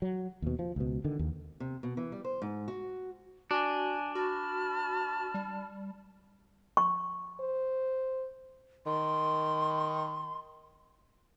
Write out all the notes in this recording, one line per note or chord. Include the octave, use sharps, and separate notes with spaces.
F#3
D#2 B2
F3
C#2 B2
D3 D#3
D#2
C3
B2
E3
G3
C5
G#2
F#4
D4 F#4 G#5
F#4 A5 B5 F6
G3
C#6
C5
D#3 C6